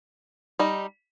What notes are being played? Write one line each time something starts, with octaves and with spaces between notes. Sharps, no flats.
G3 D#4